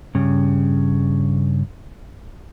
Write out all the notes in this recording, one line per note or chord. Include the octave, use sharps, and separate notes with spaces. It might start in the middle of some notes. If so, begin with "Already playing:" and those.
G2 C#3